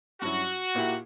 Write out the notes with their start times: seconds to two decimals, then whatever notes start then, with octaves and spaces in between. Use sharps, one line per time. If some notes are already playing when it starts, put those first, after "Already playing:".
0.21 G2 F#3 C#4 E4 F#4
0.75 A#2 A#3 E4 G4